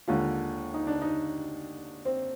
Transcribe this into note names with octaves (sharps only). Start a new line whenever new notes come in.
D#2 D3 G#3 F4
D#4
D4
D#4
C4